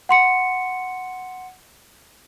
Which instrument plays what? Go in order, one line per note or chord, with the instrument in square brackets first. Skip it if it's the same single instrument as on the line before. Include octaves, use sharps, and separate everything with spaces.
[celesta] F#5 C6 C#7